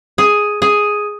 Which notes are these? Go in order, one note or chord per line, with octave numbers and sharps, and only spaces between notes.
G#4
G#4